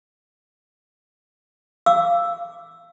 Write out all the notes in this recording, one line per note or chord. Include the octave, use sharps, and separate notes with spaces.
F5 D6 E6